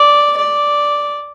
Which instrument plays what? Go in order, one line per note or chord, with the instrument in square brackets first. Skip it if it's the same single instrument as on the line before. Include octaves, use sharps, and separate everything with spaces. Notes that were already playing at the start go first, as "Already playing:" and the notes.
Already playing: [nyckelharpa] D5
D5